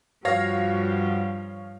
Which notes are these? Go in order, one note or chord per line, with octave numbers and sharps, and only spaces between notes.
G2 F3 F#4 C#5 F5 A#6